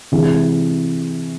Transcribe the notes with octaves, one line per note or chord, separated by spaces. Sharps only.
C3 E3 G#3